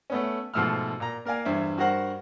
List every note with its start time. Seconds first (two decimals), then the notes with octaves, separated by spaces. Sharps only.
0.10 A3 B3 C#4
0.54 G#2 B2 F3 A3 E6 F6
1.00 A#2 A#5
1.25 A#3 A#4 D5 F5 G#5
1.45 E2 G2 C5 E5
1.78 G2 F#4 A#4 C5 F#5